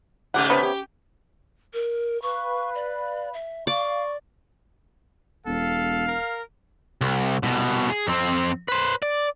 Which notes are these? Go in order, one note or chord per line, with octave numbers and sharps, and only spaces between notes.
G#2 C#3 A3 G4 F#5
C3 B3 C#4
G4
A#4
B4 F5 B5 C#6
D5
E5
D5 F5 C#6
E1 A4 F5
A#4
C2
C2 B2
G#4
F2 C4
B4 C5
D5